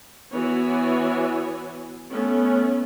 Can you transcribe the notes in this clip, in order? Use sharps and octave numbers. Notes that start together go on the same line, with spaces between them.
E3 B3 F#4 C#5 G#5
A3 B3 C#4